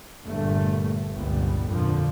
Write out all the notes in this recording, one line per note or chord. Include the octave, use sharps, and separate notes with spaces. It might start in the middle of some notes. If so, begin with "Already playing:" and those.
G1 G2 A#2 A3
G1 C#2 A#2 G3 B3
F2 A#2 D3 F3